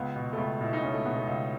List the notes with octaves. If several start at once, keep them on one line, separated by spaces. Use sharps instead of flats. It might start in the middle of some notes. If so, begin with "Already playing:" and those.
Already playing: C#2 B3
B2
A3
C#2 B3
B2 E4
D#4
C#2 C#4
A3
B2 B3
B3
C#2